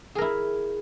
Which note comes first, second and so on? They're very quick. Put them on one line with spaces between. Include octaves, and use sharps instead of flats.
G#4 A#4 E4